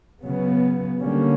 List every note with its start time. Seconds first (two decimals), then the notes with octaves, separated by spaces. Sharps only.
0.23 C#3 F#3 B3
1.01 D3 G3 A#3 C#4